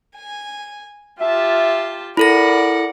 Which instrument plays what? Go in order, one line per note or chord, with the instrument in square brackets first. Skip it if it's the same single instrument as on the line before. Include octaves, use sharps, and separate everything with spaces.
[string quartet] G#5
[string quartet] F4 G4 A5 [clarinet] E5
[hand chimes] E4 A4 A#6 [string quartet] A#4 D5 F#5 [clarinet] B5